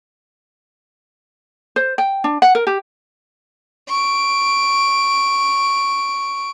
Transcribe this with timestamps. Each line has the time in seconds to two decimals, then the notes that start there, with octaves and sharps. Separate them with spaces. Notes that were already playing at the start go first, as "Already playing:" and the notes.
1.76 C5
1.98 G5
2.24 D4
2.42 F#5
2.55 A#4
2.67 G4
3.88 C#6 D7